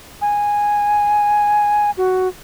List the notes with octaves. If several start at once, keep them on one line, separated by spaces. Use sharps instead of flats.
G#5
F#4